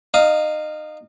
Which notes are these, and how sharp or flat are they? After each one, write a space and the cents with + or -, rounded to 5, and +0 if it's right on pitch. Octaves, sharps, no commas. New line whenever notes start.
D#4 -25 F5 +0 D#6 +10